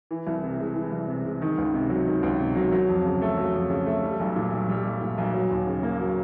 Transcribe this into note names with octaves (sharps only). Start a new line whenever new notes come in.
E3
C2
C3
G#3
E3
C2
C3
G#3
D#3
C#2
C3
F#3
D#3
C#2
C3
F#3
F#3
F2
C#3
A3
F#3
F2
C#3
A3
G3
B1
A#2
B1
G3
B1
A#2
B1
F#3
D#2
C#3
A#3
F#3